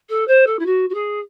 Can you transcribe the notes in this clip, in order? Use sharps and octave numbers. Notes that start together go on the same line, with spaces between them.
A4
C5
A4
E4
F#4
F#4
G#4